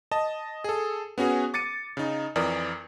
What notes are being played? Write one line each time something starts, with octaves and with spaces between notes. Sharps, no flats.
D#5 A5
G#4 A4
B3 C#4 F#4 G#4
D6 A6 C#7 D#7
C#3 D#4
F2 E3 A#4 D5 D#6